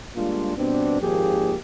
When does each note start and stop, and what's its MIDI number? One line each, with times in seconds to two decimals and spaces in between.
0.16 0.57 55
0.16 0.57 56
0.16 0.57 58
0.16 0.57 62
0.16 0.57 65
0.57 1.00 43
0.57 1.00 47
0.57 1.00 59
0.57 1.00 60
0.57 1.00 62
1.01 1.55 32
1.01 1.55 39
1.01 1.55 53
1.01 1.55 58
1.01 1.55 67
1.01 1.55 68